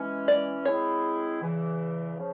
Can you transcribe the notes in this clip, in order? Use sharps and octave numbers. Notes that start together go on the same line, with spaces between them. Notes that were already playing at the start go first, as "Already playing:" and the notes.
Already playing: E3 G#3 C#4
D5
G#3 C4 E4 G#4 C#5
E2 C#3 E3
C#3 F3